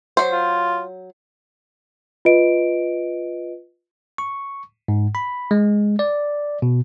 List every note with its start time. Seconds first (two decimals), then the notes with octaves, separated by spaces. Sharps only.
0.17 F#3 C5
0.32 F4
2.25 F4 B4 D#5 D7
4.18 C#6
4.88 G#2
5.15 B5
5.51 G#3
5.99 D5
6.62 B2